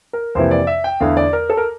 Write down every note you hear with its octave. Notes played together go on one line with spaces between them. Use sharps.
A#4
F2 C3 E3 A#3 E4 C5
D5
E5
G5
E2 D3 A3 E4 F5
D5
A#4
A4
A#4